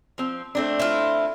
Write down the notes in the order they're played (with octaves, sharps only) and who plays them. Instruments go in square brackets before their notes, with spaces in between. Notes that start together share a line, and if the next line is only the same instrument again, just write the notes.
[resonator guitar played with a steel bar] F3 C4
A3 C4 D4
[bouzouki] E4 F4